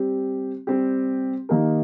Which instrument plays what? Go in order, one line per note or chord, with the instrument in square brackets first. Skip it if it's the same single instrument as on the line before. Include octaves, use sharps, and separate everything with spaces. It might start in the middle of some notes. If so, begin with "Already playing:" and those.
Already playing: [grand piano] G3 C4 G4
G3 C4 G4
D#3 A#3 D#4 G4 A#4